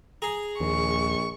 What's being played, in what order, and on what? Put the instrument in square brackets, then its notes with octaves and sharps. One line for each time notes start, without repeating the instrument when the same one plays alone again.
[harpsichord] G#4 A#5
[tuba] A#1 [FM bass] D#2 [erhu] C#6